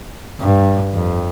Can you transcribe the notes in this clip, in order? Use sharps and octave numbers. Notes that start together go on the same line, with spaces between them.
G2
F2